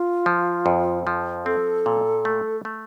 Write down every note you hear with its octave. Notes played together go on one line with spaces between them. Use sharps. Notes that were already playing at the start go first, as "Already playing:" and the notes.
Already playing: F4
F3
F2
F3
C4 A4
A#2
A3
A3